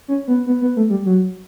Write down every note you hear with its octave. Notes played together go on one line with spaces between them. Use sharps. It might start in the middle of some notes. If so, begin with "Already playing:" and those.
C#4
B3
B3
B3
A3
G3
F#3